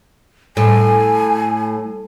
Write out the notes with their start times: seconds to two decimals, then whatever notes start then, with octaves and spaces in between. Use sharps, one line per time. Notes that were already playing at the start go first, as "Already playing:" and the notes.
0.57 A2 G#5